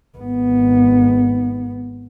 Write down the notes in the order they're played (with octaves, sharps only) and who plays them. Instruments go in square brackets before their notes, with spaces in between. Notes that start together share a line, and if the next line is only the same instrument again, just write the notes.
[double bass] G#1 B3